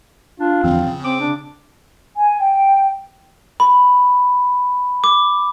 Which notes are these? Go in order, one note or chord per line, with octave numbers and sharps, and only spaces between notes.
D4 F4
E2 D3 F3 C4
C#3
C4 D6
D4
G#5
G5
B5
D6